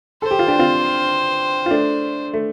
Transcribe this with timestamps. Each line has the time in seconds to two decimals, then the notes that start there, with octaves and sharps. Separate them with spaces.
0.22 A4 C5
0.31 G4
0.39 F4
0.48 D4 G4
0.59 C4 F4
1.66 F4
1.71 A3 D4
2.33 A3